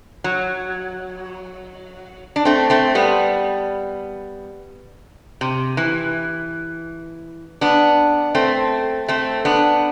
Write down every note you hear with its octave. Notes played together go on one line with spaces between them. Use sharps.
F#3
D4
A3 C4
A3 C4
G3 B3
C3
E3
B3 D4
A3 C4
A3 C4
B3 D4